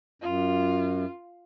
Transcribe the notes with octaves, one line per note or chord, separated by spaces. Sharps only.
F#2 F4